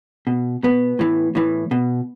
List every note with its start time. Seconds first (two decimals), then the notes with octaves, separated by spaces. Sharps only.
0.27 B2
0.63 B2 B3
0.99 A2 E3
1.35 A2 E3
1.71 B2